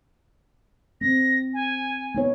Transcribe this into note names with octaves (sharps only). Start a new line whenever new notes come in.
C4 A#6
G#5
B3 D#4 C#5